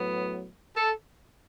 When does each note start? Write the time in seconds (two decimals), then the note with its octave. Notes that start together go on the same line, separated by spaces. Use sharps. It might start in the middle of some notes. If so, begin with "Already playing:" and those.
Already playing: A2 F#3 B3
0.75 A4